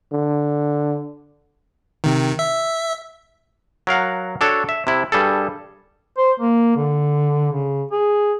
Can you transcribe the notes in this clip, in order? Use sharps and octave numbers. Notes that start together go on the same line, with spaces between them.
D3
C3 D#3
E5
F#3 A#4 F5 F#5
D4 F#4 A4 C#5
E5
C3 E4
G2 G3 G#4 A4
C5
A#3
D3
C#3
G#4